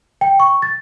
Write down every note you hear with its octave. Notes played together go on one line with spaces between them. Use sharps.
G5
C#6
A6